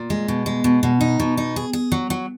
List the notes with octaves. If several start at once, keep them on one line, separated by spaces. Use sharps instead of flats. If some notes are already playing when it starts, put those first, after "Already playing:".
Already playing: A#2
G#3
B2
G#3
B2
B2
D#4
B2
D#4
G#4
G#4
F#3
F#3